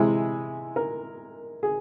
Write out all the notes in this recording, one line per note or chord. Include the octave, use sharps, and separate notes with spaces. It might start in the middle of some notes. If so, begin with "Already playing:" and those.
Already playing: C3 E3 G#3 E4 G#4
A#4
G#4